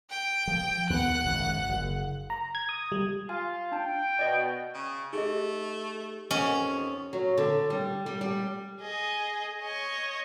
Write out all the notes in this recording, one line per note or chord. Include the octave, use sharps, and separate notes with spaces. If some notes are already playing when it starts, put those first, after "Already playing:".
G5
F3
D#2 B3 F#5 F#6
G#1 F#2 C#3
F#1
A#5
G#6
D#6
G3
F4 G#5
D4 G5 A5
B2 D5 D#5
C#3
A3 D#4 G4 G#4 D#5
F2 C#4 D#5 F#5 D#6
F#3
D3
G3
G3
G3
G#4 D#5
C#5 D#5